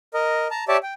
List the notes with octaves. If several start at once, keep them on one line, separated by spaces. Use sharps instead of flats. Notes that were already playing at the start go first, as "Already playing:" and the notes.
A#4 D#5
A5 A#5
G4 C#5 D5 E5 A5
G5